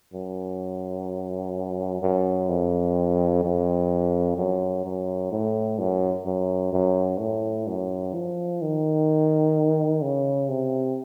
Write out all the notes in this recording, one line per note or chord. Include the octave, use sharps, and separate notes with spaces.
F#2
F#2
F2
F2
F#2
F#2
A2
F#2
F#2
F#2
A2
F#2
F3
D#3
C#3
C3